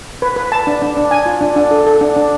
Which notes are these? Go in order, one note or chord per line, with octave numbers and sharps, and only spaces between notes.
B4
B4
A5
D4
D4
D4
G#5
F4
D4
D4
A4
A4
D4
D4